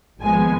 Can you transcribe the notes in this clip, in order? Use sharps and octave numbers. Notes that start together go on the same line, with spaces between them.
G#1 G#2 F3 G#3 B3 G#5